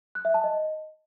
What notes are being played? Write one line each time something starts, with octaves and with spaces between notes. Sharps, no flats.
F#6
E5
A5
D#5